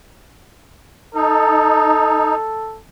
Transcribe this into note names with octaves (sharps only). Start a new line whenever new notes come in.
D#4 A4